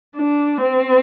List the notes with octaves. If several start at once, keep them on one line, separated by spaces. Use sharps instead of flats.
D4
C4